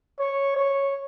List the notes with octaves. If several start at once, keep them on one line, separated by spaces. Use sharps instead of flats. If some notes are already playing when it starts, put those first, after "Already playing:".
C#5
C#5